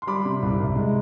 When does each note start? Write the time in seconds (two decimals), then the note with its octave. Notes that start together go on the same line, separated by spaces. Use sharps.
0.02 C6
0.07 G3 B5 D6
0.25 C3
0.42 C2
0.58 C2
0.75 G#3